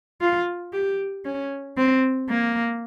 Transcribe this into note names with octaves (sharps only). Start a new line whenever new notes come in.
F4
G4
C#4
C4
A#3